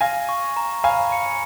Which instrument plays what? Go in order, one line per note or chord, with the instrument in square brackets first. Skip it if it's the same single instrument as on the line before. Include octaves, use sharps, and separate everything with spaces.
[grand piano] F5 G#5 [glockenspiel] A#6
[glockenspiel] C#6
A#5
[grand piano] F5 G#5 [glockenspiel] B5
[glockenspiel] C#7